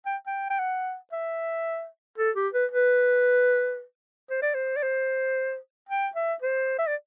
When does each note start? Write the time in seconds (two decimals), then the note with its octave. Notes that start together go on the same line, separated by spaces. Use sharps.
0.06 G5
0.27 G5
0.50 G5
0.59 F#5
1.12 E5
2.18 A4
2.36 G4
2.53 B4
2.71 B4
4.30 C5
4.42 D5
4.54 C5
4.76 D5
4.83 C5
5.89 G5
6.15 E5
6.42 C5
6.78 E5
6.87 D5